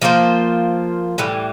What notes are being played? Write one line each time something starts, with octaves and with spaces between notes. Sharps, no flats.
F3 A#3 F4 C5
A2 E3 G3